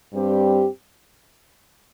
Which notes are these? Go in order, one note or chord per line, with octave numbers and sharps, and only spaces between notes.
G2 G3 C4 G4